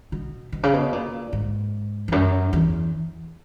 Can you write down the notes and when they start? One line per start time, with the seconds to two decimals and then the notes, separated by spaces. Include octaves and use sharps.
0.12 B2
0.52 B2
0.63 C#3
0.73 B2
0.93 A#2
1.33 G#2
2.08 E2
2.12 F#2
2.53 E2